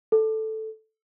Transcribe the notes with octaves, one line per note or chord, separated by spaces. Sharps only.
A4